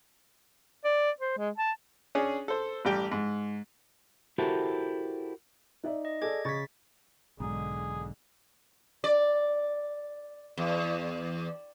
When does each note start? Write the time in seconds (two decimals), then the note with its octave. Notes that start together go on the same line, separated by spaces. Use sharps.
0.85 D5
1.20 C5
1.38 G#3
1.58 A5
2.15 C#4 D4 G#4
2.48 A4 C5
2.85 A1 G3 G4 G5
3.12 G#2
4.38 E4 F#4 G4 A4 A#4 C5
5.84 D#4 D5 E5
6.05 D#5
6.22 G#4 A4 D5 D#5 D6 G#6
6.45 C#3 C#6 G#6 A6 B6
7.40 B1 G#2 D3 G#3 G#4
9.04 D5
10.57 E2